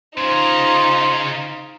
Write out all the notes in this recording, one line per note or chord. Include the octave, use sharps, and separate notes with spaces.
C#3 D#4 F4 G#4 C5